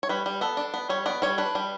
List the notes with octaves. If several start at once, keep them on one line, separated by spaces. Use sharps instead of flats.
C#5
G3 B4
G3
B3 A4
D4
B3
G3 C#5
B3 D5
G3 C#5
D4 B4
G3